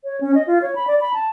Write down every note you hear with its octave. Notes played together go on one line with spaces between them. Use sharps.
C#5
C#4
D#5
F4
C#5
B5
D5
B5
A5